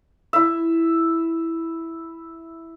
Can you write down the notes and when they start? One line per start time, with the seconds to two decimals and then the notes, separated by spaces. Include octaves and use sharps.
0.33 E4 E5